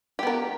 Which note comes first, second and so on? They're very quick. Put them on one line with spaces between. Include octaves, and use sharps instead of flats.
G4 B3 A#4